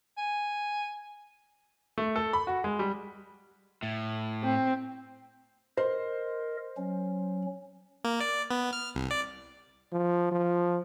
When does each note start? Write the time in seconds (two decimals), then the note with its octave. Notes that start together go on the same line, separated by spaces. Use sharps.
0.18 G#5
1.98 A3
2.16 A4
2.33 B5
2.47 F#4
2.64 G#3
2.79 G3
3.83 A2
4.43 C4
5.77 A#4 C5 D#5
6.77 F#3 C#4
8.04 A#3
8.20 D5
8.51 B3
8.73 F6
8.95 C2
9.11 D5
9.92 F3
10.32 F3